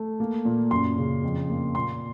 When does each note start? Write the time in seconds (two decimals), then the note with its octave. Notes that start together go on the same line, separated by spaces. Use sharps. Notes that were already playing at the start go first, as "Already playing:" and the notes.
Already playing: A3
0.20 A#3
0.45 A#2
0.71 F#2 C6
0.98 C#3
1.24 F2
1.50 A#3
1.75 A#2 C6